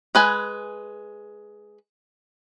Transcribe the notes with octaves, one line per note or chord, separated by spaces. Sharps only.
G#3 B4 G#5